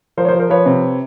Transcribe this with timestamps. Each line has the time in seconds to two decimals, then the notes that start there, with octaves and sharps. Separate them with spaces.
0.17 F3 A#4 C5
0.25 C#5
0.28 A#4 C5
0.34 F3
0.40 A#4 C5
0.50 F3 B4 C#5
0.66 C3